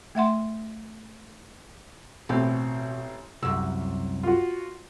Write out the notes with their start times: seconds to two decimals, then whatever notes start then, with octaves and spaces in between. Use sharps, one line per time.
0.15 A3 E5 F#5 C6
2.29 A1 B2 C4
3.43 C2 F#2 E6
4.23 F4 F#4